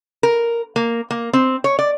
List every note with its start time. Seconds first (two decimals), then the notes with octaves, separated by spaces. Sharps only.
0.23 A#4
0.76 A#3
1.11 A#3
1.33 C4
1.64 C#5
1.79 D5